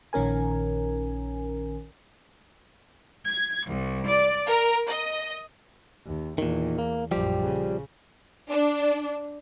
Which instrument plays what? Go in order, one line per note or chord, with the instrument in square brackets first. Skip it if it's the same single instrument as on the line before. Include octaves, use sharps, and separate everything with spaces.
[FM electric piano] A#1 D#3 C#4 A#4 G#5
[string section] G#6
C2
D5
A#4
D#5
[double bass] D#2
[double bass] E2 [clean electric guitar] A#2 D#3
[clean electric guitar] A#3
[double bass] A#1 F#2 [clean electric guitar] F3 G3 G4
[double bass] C#3
[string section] D4